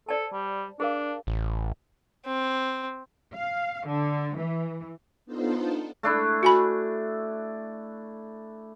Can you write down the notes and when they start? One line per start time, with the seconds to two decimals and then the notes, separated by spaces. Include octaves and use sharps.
0.09 A4 C5 D5 A5
0.32 G3
0.80 D4 G#4 A#4 F5
1.27 A1
2.25 C4
3.34 F5
3.86 D3
4.37 E3
5.26 B3 D4 D#4 F4 A4 C5
6.03 A3 D4 E4
6.43 F#4 G#5 B5